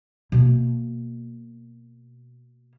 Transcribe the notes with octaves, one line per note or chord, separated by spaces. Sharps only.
B2 A#3